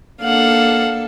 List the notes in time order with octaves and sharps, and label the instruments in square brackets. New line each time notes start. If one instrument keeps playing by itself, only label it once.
[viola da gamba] A#3 D4 A4 [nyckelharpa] F5 F#5